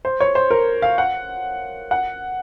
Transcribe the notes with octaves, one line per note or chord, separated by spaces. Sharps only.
C5
C#5
C5
A#4
F5
F#5
F#5